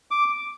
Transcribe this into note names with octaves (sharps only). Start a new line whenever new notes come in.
D6